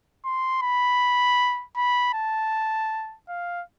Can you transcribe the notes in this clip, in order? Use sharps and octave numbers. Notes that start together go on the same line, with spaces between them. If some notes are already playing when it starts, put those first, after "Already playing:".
C6
B5
B5
A5
F5